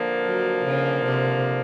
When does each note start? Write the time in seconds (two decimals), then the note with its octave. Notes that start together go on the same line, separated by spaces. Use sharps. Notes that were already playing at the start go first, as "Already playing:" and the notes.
Already playing: D3 F3 A#3
0.25 F#3
0.66 C#3
1.06 C3